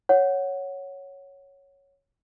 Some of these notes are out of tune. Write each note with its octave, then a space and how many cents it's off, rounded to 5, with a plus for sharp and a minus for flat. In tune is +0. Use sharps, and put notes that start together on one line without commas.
C#5 +0 F#5 +0